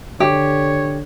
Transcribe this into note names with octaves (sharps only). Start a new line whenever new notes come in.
D3 G4 C#5